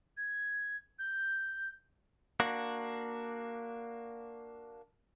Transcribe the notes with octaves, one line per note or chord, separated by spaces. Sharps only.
G#6
G6
A#3 D4 F#4